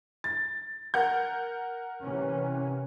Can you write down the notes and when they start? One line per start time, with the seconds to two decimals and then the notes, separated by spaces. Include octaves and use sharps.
0.24 A6
0.94 A#4 F#5 G6
2.01 C3 E3 C#4